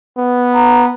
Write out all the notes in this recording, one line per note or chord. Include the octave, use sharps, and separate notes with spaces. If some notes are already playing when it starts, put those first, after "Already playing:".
B3
A#5